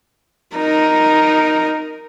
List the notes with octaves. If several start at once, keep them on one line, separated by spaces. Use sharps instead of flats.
D#4 A#4